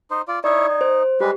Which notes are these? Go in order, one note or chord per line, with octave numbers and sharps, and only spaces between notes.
D#4 C5
F4 D5
D#4 E4 C#5 D5 G#6
D#4
C5
G3 G#3 G4 B4